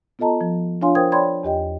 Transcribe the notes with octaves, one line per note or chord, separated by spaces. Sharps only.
B3 F4 A4 D#5 A5 A#5
F3
D4 F4 C#5 F5 G#5 C6
A#4 C5 G5 D#6 G#6
C#5 D5 G5 B5 C6 G#6
E2 G4 D#5 G5